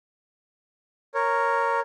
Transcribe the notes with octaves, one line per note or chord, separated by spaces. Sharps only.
A#4 C#5